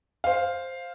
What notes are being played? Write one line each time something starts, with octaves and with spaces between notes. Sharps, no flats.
C5 F5